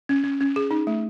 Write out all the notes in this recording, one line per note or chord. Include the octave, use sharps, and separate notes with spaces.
C#4
C#4
C#4
G#4
D#4
A3